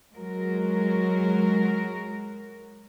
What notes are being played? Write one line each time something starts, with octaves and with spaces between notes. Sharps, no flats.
F#3 G#3 F#4 A#4